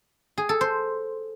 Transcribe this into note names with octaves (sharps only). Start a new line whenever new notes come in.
G#4
A4
C5